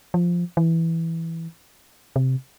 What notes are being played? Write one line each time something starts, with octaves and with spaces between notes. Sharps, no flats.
F3
E3
C3